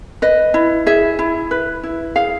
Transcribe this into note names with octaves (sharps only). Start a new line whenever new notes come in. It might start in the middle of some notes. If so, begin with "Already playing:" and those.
B4 D#5
E4
G#4 E5
E4
B4
E4
G#4 F5